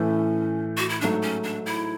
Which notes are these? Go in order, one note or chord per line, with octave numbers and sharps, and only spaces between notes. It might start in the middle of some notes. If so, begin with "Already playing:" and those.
Already playing: A2 E3 A3 C#4
F#4
E4
G#2 F#3 A3 D4
C#4
D4
E4